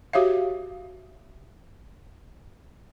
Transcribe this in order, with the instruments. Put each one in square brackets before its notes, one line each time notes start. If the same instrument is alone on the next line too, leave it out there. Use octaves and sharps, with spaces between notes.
[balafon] F#4 G4 C#5 E5 F5